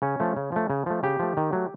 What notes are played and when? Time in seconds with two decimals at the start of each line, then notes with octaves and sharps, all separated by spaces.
0.02 C#3 C#4
0.20 F3 A3
0.37 C#3
0.52 F3 A3
0.70 C#3
0.86 F3 A3
1.03 C#3 G4
1.19 F3 A3
1.37 D#3
1.53 F#3 A3